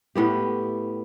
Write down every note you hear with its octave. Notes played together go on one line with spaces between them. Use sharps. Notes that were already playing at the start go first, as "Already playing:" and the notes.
A2 B3 G4